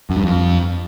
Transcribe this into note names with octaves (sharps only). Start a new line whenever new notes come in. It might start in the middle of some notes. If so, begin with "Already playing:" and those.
F#2
G2
F2